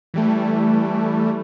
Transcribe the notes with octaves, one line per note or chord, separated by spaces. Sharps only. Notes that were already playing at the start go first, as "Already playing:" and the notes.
E3 G3 A3